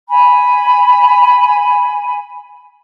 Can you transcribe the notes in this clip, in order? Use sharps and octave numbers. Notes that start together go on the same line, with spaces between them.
G#5 B5